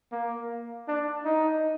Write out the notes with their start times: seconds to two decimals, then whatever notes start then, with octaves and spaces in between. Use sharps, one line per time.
0.12 A#3
0.88 D4
1.25 D#4